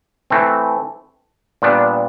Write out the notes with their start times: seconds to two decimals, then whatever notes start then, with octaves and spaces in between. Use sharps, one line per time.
0.30 E3 A3 C4
1.62 A#2 G3 B3 D4